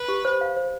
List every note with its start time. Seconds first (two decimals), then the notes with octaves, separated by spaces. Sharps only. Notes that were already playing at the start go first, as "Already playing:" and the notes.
Already playing: B4
0.08 G4
0.25 C5
0.41 F5
0.57 C5